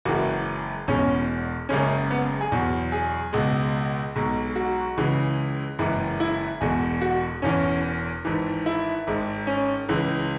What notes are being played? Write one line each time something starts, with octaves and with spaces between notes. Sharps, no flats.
F#1 F#2 E3 G#3 F#4
E1 E2 B2 G#3 C#4
F#1 F#2 C#3 G#3 C#4
B3
G#4
E2 B2 F#3
G#4
C#2 B2 G#3
B1 B2 G#3
F#4
C#2 C#3 E3 G#3
F#1 F#2 E3 G#3
E4
E1 E2 B2 G#3 G#4
F#4
E1 E2 E3 C#4
G#1 G#2 E3
E4
G#1 G#2 G#3
C#4
C#2 C#3 E3 G#3